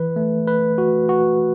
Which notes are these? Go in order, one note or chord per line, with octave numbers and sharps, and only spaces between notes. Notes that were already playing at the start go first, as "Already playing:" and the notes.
Already playing: E3 B4
A3
B4
F#4
F#4